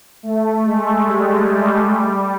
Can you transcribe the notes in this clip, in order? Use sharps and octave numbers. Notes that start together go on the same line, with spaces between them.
A3
G#3
G3
G3